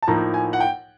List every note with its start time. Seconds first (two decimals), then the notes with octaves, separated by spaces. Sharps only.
0.02 A5
0.08 A2 F3 A#3 D#4 A#5
0.34 G#5
0.53 F#5
0.61 G5